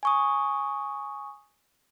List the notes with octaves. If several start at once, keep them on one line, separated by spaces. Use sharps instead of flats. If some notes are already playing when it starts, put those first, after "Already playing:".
G#5 C#6 D#6